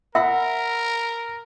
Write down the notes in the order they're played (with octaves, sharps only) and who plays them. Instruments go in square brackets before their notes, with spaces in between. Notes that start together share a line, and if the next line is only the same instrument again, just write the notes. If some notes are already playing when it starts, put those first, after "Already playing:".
[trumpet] A#4 [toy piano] E5 [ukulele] F#5 [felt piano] B5 E6